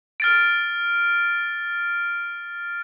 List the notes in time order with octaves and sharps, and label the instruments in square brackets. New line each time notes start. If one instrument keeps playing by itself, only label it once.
[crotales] F6 A6 D7